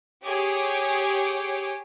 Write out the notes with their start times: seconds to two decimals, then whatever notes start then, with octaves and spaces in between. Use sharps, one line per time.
0.24 G4 G#4 C#5 G5 D6